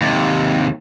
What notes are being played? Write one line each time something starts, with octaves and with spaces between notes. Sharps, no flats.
D#2 C3